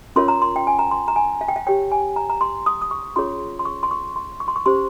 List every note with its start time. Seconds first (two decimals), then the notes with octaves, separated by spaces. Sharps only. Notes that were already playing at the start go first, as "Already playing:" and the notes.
0.16 C#4 F4 A#4 C#5 C6
0.28 A#5
0.42 C6
0.56 G5
0.67 G#5
0.79 A#5
0.91 C6
1.08 A#5
1.16 G#5
1.41 F5
1.48 G5
1.56 F5
1.67 G4 C#5 G5
1.92 G#5
2.16 A#5
2.30 A#5
2.41 C6
2.66 D#6
2.82 D#6
2.91 C#6
3.16 C#4 F4 G#4 C#5 C6
3.59 C6
3.65 C#6
3.83 C6
3.91 C#6
4.16 C6
4.40 C#6
4.48 C6
4.56 C#6
4.66 C#4 G4 C5 C6